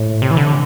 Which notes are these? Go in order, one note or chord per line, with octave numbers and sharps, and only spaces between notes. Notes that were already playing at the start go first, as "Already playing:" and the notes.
Already playing: A2
C3
E3
D3